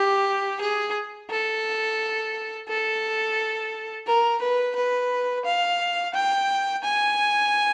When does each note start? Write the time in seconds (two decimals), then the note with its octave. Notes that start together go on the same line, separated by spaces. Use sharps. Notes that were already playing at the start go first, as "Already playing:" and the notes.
Already playing: G4
0.62 G#4
1.31 A4
2.69 A4
4.07 A#4
4.42 B4
4.76 B4
5.46 F5
6.14 G5
6.84 G#5